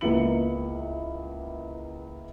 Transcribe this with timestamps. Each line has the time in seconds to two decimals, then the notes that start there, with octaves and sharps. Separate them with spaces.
0.01 C#2 A#3 B3 E4 C#7 F#7